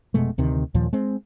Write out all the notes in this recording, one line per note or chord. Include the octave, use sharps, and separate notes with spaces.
F1 B2 G#3 A3
D2 C3 D#3
D#2 A#2 F3
G#3 C4